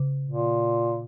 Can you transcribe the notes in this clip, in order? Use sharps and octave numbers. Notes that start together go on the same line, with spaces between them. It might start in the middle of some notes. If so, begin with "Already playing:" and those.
Already playing: C#3
A#2